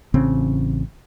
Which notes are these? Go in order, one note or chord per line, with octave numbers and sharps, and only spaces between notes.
A1 C#3 C4